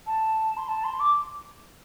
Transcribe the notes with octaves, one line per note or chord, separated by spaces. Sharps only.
A5
C6
A5
C6
D6